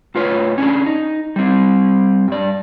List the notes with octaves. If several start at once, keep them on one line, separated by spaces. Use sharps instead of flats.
A2 F4 B4 C#5
C#4 D4 G#4
D#4
G3 C4
G2 D5